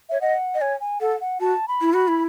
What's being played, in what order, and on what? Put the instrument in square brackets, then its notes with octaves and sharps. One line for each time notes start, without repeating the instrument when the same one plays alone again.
[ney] C#5 [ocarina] E5
[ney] D#5 [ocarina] F#5
[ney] D#5
[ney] C#5 [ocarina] G#5
[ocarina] G#5
[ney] A4 [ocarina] F#5
[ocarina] F#5
[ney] F#4 [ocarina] A5
[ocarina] B5
[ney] E4
[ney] F#4 [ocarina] B5
[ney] E4